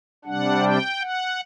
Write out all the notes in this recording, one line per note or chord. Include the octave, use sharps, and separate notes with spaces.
C3 G3 D4 F#5
G5
F#5